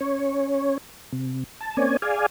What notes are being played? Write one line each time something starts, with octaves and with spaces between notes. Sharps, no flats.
C#4 C#5
C3
A5
A#3 C4 C#4 C#5 D5 G#5
G#4 D5 F5 G#5